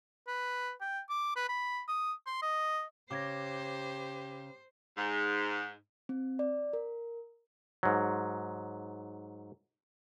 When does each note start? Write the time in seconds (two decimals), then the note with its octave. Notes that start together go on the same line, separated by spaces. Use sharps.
0.28 B4
0.81 G5
1.10 D6
1.36 B4
1.49 B5
1.88 D#6
2.26 C6
2.42 D#5
3.11 C#3 G4 C5 D6 G#6 A#6
4.96 G#2
6.09 C4
6.39 D5
6.73 A#4
7.83 G#2 F#3